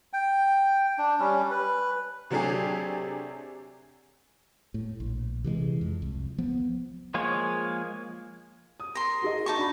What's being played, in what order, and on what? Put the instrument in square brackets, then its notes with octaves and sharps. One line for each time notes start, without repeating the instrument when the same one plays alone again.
[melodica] G5
D4
G3 C#4
B4
[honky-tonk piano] C3 F#3 A3 D4 G4 G#4
[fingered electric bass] A2
A#1
C3 E3 G3 G#3
F2
C2
F3 B3
[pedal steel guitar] F3 G#3 A#3 G#4 C#5
[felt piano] D#6
[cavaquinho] A#4 C6
[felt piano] F#4 G#4 D#5
[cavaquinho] D#4 A5 C#6
[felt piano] D4 F#4 B5